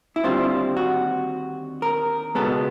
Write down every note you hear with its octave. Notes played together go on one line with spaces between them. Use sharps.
E4
D#2 D3 G3 C4 F4
F#4
A#4
C#2 B2 G#3 B3 A4